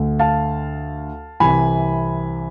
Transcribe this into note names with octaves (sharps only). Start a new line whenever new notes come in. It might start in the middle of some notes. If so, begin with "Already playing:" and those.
Already playing: D2 D3
F5 A5
C2 C3 E3 G#5 B5